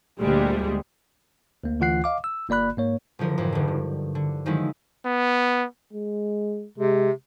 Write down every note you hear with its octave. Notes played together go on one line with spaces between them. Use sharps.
D2 A#2 G3 G#3
D2 A#3
D2 E3 F4 F#5 F#6 C7
D#5 F5 D6
E6
G1 A#3 D5 B5 F#6
G#2 A#3 C#5
F#1 D3 F3 A#4
F2 G#2 E3
F#1 D3
G2
D3
D#3 F3 F#3 G#3 D#4 E4
B3
G#3
C3 G#3